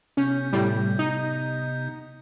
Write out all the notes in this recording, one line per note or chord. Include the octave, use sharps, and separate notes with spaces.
C3 B3 C#4 G6
A2 G3
D#4